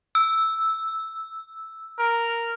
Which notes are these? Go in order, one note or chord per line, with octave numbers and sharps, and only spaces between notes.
E6
A#4